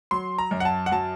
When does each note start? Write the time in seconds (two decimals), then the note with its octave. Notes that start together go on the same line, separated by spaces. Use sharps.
0.11 F#3 C6
0.38 A#5
0.51 F#2
0.60 F#5
0.65 A5
0.86 F#5
0.92 F#3 A5